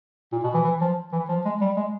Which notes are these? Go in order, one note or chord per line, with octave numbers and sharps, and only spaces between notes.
A#2
B2
E3
E3
F3
E3
F3
G#3
G3
G#3